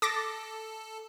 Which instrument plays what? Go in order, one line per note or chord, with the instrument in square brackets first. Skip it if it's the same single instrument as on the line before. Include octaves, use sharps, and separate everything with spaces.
[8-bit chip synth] A4 [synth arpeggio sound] D6 A6 A#6